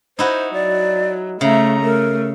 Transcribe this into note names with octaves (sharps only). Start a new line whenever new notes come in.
D#4 E4 F#4 C5
F#3 D5
C#3 A3 E5 A#5
A3 A#4